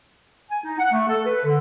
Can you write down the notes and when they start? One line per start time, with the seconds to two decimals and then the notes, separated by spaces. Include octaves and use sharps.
0.50 G#5
0.64 D#4
0.78 F#5
0.92 A3
1.08 A4
1.26 B4
1.44 D3